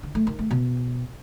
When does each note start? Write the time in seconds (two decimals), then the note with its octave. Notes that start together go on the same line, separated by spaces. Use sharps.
0.03 D3
0.15 A3
0.27 D#3
0.39 A3
0.51 B2